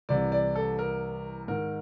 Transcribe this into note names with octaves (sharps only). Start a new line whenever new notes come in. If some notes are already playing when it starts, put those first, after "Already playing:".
C2 C3 E3 D5
D5
A4
A#4
G#2 D#3 A#4